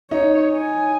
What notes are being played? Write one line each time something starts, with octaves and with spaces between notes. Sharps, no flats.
D#4 C#5
G#5